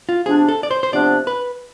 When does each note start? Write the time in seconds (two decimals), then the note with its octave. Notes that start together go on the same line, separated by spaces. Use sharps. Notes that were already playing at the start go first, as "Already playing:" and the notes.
0.09 F4
0.26 C3 F3 B3 D4 G#4
0.49 A4
0.63 D5
0.71 C5
0.83 C5
0.93 C3 F3 B3 D4 D5
1.27 B4